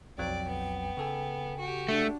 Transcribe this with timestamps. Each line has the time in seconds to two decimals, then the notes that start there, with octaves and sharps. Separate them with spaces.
0.18 B1 F2 F#3 D5 G5
0.48 B3
0.97 C#3 A4 G#5
1.59 F#4 G4
1.89 A3 D4